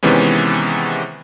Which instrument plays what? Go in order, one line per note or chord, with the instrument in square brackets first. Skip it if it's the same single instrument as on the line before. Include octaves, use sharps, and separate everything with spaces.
[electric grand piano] C3 D#3 E3 G#3 B3 C#4